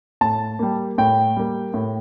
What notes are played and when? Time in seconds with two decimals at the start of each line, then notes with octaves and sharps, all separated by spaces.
0.21 A2 A5
0.59 G3 A#3
0.98 A2 G5
1.37 G3 A#3
1.74 A2